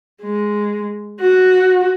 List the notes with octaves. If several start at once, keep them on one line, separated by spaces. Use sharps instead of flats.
G#3
F#4